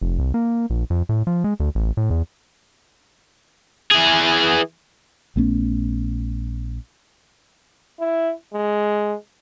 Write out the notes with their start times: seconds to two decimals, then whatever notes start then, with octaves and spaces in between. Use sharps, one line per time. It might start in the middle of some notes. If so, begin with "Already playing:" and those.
0.01 F1
0.19 C2
0.34 A#3
0.70 A#1
0.90 F2
1.09 A2
1.27 F3
1.44 G#3
1.60 D2
1.75 A1
1.97 A2
2.10 E2
3.92 E3 G#4
5.36 A#1 A3 B3 C#4
8.00 E4
8.53 G#3